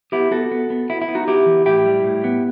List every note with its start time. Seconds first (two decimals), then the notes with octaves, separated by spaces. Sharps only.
0.12 B3 E4 G4
0.31 B3 F#4 A4
0.52 B3
0.70 B3
0.90 B3 E4
1.02 E4
1.08 B3
1.15 D#4 F#4
1.28 B3 E4 G4
1.46 E3
1.66 A2 E4 G4
1.85 G3
2.04 A2
2.24 B3